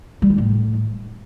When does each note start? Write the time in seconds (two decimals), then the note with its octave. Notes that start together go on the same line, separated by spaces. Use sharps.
0.22 G3
0.30 D#3
0.38 A2